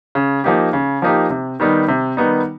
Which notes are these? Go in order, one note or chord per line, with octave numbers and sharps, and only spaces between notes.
C#3
F3 A#3 D#4 G4
C#3
F3 A#3 D#4 G4
C3
D#3 G3 B3 D#4
C3
D#3 G3 B3 D#4